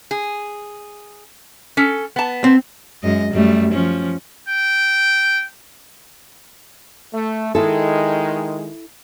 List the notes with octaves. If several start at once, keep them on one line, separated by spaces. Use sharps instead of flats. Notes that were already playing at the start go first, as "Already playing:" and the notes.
G#4
C#4 A4
B3 A5
C4
F#2 G#3 D#5
F#2 G3 A3
F3 C#4
G5
A3
D#3 G#3 E4 A4